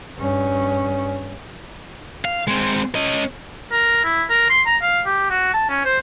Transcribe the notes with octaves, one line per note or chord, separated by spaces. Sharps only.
G2 C#4
F5
G#3 C4
C#4 D#5
A#4
E4
A#4
C6
A#5
F5
G4
F#4
A5
C#4
C5